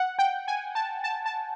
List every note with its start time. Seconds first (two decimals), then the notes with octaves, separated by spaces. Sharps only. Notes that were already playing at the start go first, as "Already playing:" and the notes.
Already playing: F#5
0.19 G5
0.48 G#5
0.75 A5
1.04 A5
1.26 A5